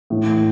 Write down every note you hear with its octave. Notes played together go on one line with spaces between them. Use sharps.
A2 E3